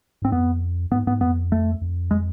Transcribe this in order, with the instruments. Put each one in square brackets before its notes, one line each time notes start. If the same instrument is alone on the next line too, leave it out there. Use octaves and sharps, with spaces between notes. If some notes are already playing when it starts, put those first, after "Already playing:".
[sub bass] G#2 [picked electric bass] C4
[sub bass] F2 [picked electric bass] B3
[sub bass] G#2 [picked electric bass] B3
[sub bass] G#2 [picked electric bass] B3
[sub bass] F2 [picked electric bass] B3
[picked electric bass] A3
[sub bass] F2
[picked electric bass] G#3